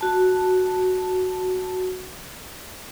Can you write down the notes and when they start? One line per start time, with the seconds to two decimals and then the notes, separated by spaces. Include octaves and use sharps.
0.01 F#4 A5